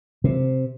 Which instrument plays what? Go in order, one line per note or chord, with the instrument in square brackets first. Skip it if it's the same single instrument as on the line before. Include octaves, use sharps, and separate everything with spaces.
[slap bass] C3